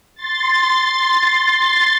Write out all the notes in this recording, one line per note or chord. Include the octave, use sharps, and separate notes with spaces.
C6 A6